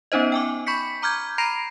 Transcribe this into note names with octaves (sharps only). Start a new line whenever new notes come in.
B3 C#4 D#4 C5 D#5
G5 G#5 D6
B5 C#6 G6 B6 C#7
A#5 D6 F6 G6 G#6
A#5 B5 A#6 C7 D7 F7